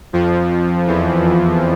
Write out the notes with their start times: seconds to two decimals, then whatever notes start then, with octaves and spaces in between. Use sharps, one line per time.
0.13 F2 F3
0.87 E2 E3